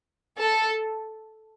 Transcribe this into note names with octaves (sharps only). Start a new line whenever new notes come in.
A4